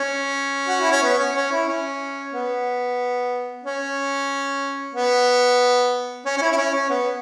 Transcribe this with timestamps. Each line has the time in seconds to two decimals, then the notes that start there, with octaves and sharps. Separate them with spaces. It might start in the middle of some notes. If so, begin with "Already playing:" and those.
Already playing: C#4
0.68 F#4
0.80 E4
0.91 C#4
1.03 B3
1.19 C#4
1.36 C#4
1.52 E4
1.68 C#4
2.33 B3
3.64 C#4
4.95 B3
6.25 C#4
6.38 C#4
6.42 E4
6.52 E4
6.57 C#4
6.74 C#4
6.90 B3